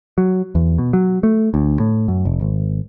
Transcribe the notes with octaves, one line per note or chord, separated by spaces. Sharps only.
F#3
E2
B2
F#3
A3
D2
A2
F#2
F1
G#1